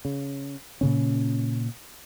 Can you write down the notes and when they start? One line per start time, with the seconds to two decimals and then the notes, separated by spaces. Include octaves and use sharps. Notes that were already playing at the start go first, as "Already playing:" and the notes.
0.05 C#3
0.81 A#2 C#3 C#4